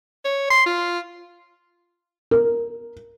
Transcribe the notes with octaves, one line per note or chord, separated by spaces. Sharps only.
C#5
C6
F4
A#4